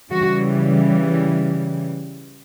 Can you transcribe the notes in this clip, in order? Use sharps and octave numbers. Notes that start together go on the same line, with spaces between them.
C#3 E3 G3 F#4